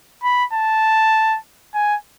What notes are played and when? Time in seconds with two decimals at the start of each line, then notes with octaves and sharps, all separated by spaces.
0.23 B5
0.53 A5
1.74 G#5